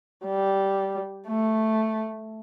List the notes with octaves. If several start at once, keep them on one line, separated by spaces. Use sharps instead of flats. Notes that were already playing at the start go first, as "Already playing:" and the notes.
G3
A3